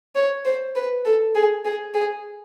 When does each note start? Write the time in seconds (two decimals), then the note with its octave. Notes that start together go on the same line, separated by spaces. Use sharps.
0.16 C#5
0.45 C5
0.76 B4
1.05 A4
1.35 G#4
1.65 G#4
1.94 G#4